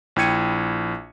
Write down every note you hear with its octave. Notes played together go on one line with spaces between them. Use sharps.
A#1 E4 G5 G#6 C#7 D#7